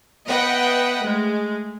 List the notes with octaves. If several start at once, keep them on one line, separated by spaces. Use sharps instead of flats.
B3 B4 D#5 E5 F#5 G5
G#3 A3